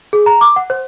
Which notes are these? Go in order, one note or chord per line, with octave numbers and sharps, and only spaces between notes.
G#4
A#5
D6
F#5
C5